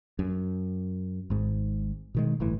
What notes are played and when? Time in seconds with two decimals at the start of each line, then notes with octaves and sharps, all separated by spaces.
0.19 F#2
1.30 G#1 G#2
2.15 B2 D#3 G#3
2.40 G1 A2 E3